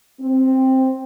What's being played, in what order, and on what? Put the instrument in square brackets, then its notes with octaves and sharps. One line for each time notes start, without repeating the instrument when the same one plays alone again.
[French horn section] C4